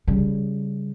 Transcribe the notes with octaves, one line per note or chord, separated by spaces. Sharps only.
C#3 G3